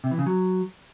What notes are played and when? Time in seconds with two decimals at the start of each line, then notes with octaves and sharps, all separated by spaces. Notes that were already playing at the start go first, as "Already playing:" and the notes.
0.04 C3
0.11 E3
0.19 C#3
0.26 F#3